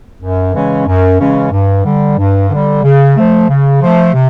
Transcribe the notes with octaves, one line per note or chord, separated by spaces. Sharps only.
F#2
C#3 E3 G#3 C#4
F#2
C#3 E3 G#3 C#4
G2
D3 G3
G2
D3 G3
C#3
F3 A3
C#3
F3 A3
C3